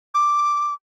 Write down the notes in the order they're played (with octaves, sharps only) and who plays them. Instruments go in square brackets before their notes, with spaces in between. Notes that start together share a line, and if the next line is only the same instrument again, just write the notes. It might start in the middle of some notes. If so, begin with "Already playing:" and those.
[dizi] D6